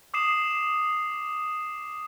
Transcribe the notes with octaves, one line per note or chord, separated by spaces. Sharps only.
D6 D#6 C7 E7